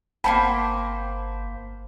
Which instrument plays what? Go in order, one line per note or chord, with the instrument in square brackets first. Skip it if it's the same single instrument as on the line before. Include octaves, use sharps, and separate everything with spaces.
[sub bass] G1 [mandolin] A#3 C#4 C5 [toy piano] F#5 G5 A5 [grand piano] B5